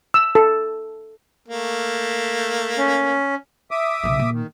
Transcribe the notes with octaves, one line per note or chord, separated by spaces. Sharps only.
E6
A4
A3 A#3
C#4
E5 D6 D#6
B1 C#3
A#2
D#3